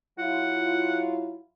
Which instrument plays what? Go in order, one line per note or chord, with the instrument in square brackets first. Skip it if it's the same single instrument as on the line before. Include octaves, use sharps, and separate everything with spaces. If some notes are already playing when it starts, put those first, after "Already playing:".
[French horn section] F#3 E4 F4 [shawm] F#5